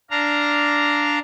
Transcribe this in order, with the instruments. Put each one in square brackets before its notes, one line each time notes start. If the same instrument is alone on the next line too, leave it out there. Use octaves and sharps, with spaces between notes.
[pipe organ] D4 F5 A#5